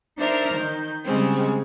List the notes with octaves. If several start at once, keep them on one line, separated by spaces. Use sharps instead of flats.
D4 D#4 A#4 C5 E5
D#3 G6
C#3 G3 G#3 C4 C#4